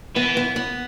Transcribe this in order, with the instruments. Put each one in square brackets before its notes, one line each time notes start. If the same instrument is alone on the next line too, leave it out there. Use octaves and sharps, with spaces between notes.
[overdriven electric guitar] E3 [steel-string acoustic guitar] B3
[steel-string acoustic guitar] B3
B3